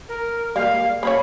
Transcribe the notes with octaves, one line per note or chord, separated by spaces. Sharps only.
A#4
G3 G#3 A#3 F5
A#3 C#4 C#5 B5